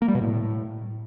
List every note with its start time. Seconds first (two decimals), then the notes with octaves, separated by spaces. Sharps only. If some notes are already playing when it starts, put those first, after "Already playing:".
0.02 A#3
0.08 G3
0.15 B2
0.21 A2